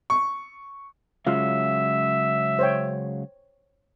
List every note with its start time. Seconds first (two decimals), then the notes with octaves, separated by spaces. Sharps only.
0.10 C#6
1.27 C#3 F#3 G#3 F4 E5 F5
2.59 C5 C#5 G5